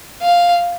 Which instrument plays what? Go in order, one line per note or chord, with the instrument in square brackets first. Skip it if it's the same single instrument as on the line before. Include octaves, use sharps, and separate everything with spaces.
[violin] F5